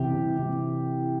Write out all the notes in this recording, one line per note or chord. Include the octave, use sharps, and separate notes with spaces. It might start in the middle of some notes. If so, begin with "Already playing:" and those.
Already playing: C2 C3 E3 G4
C2
C3 E3